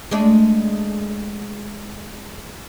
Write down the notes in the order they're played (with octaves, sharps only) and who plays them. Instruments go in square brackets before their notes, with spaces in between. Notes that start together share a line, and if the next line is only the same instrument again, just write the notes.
[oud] G#3 A3 D4